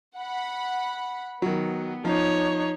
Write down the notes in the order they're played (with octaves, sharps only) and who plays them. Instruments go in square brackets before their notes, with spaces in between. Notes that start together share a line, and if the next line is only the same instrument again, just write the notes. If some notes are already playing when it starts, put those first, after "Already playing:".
[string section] F#5 B5
[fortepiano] D#3 F#3 [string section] B3
[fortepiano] F3 [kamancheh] D#4 C#5